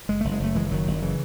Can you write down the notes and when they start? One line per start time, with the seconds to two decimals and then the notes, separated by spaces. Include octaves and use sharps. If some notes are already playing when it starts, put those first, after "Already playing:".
0.09 F#1 G#3
0.21 F#1 A3
0.32 G#3
0.40 F#1 A3
0.55 F#1 E3 G#3
0.66 E3
0.71 F#1 D#3 F#3
0.87 F#1
1.02 C#3 E3